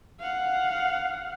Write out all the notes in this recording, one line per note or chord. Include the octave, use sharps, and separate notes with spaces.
F5 F#5